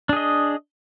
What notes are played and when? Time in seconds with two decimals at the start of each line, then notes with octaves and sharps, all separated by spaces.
0.09 D4
0.13 G#4
0.16 D#5